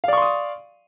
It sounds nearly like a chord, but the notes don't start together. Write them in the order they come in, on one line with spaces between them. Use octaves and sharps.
F5 D5 C#6 C6 D#6